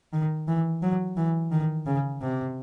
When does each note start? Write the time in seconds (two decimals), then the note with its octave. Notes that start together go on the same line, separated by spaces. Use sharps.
0.13 D#3
0.48 E3
0.83 F#3
1.17 E3
1.52 D#3
1.87 C#3
2.22 C3